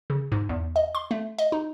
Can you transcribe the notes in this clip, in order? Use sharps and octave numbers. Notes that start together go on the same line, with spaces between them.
C#3
G#2
E2
D#5
C6
A3
D#5
D#4